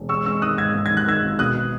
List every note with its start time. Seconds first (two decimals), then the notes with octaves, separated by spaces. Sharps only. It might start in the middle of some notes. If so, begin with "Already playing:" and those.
Already playing: E1
0.09 G#3 C#6 E6
0.26 G#3 C#6 E6
0.42 D#3 D#6 F#6
0.58 G#2 E6 G#6
0.74 G#2
0.86 D#3 G#6
0.97 F#6
1.06 D#3 E6 G#6
1.23 G#1
1.39 B2 D#6 F#6